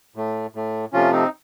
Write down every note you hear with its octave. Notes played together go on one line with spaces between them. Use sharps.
A2 A3
A2 A3
C3 F3 A3 C#4 F4
C4 D#4